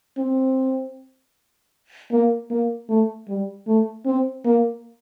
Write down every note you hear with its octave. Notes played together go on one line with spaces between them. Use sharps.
C4
A#3
A#3
A3
G3
A3
C4
A#3